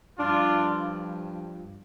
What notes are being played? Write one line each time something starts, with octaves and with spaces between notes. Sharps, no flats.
G2 F3 D4 F4